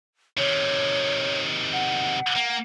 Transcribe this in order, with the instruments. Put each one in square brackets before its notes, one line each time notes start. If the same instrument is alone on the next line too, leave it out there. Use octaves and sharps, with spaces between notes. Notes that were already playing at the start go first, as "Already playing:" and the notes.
[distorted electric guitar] C3 D#3 [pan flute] C#5
[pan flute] F#5
[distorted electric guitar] A#3